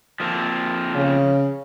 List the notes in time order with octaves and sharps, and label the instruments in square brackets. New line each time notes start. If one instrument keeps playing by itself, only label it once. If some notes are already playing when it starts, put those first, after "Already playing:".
[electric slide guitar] F3 A#3 C4
[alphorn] C#3